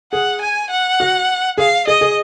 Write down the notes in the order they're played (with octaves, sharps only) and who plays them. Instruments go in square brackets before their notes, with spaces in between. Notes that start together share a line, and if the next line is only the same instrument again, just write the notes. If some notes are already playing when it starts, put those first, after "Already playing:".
[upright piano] G#4 [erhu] F#5
[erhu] G#5
F#5
[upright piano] F#4
[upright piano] G#4 [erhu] F5
[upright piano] G#4 [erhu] D#5
[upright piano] G#4